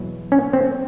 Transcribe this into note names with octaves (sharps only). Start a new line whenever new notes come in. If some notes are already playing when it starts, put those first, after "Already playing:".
Already playing: E2 B2 F#3
C#4
C4